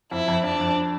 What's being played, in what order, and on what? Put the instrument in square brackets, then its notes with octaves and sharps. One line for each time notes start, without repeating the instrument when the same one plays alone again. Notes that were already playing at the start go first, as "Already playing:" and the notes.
[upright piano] F2 [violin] E4
[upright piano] F2
[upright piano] F2 [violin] D4
[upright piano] F2